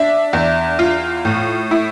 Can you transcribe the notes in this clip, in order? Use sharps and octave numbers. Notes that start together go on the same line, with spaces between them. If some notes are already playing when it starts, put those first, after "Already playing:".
Already playing: D4 E5
E2
F4
A2
E4